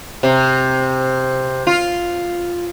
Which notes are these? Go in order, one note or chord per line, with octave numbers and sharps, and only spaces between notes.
C3
F4